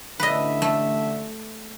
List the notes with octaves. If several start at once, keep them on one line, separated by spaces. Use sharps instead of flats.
A1 D3 B4 D#5 E5
A3